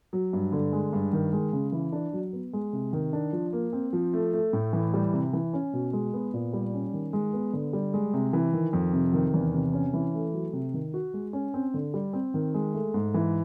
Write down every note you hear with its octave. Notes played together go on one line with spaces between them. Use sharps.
F#3
G2
D3
G#3
G2
D#3
G#3
C#3
E3
D4
F#3
B3
G#3
C3
D#3
D4
F3
A#3
C4
F3
A3
A3
A2
E3
G3
C3
E3
C#4
B2
G#3
B3
A#2
G3
C#4
D#3
G#3
B3
D3
G3
G#3
C3
E3
D#3
F2
C3
D#3
E2
C3
C#4
E3
A3
F#3
C3
D#3
F#4
G#3
C#4
C4
D3
G3
C4
D#3
G#3
A3
G#2
E3